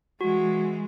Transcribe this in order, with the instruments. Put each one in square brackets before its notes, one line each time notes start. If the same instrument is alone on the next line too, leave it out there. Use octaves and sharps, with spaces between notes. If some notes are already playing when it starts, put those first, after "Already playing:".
[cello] E3 G#3 [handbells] F#4